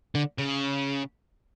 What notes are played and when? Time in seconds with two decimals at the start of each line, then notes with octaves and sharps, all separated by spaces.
0.15 D3
0.38 C#3